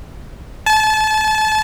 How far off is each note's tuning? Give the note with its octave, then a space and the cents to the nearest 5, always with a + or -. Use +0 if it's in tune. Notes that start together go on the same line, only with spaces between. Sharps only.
A5 -30